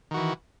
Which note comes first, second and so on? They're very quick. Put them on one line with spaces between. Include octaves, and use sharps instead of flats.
D#3 F#4 E3